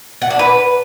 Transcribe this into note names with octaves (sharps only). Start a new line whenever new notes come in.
F#5
D4
B4